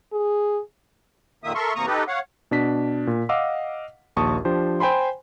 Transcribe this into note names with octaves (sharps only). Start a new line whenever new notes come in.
G#4
F2 A#2 D#3 A#3 E5 D#6
A4 A#4 E5 C6 C#6
E2 C3 A#3 A#5 C#6 D#6
D#4 G4 A4 B4 D#5
C#5 F5 F#5
B2 D4 B6
A#2
D#5 F5 F#5 D6 E6
A#1 D#2 A5 C#6 D#6
F3 D4 G4 C5
C5 G5 G#5 B5 C6